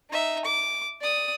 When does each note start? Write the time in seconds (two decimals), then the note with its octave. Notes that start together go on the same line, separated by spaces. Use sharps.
0.10 D#4 E5
0.45 D6
1.01 D5 D#6